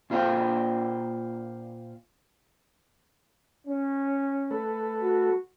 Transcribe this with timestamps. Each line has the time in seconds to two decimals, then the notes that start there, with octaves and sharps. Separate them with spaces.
0.10 A#2 F4 C5 F5 G5
3.67 C#4
4.51 A3 A4 B4
5.01 F#4